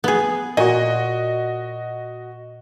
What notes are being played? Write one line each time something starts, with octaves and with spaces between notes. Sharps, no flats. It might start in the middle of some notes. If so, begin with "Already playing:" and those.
B3 G#4
A#2 F#4 D#5